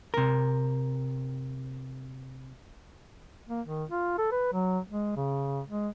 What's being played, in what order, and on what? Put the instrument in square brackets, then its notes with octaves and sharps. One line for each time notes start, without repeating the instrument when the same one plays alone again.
[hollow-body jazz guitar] C3 A#4
[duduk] A#3
D#3
F4
A4
B4
F#3
G#3
C#3
G#3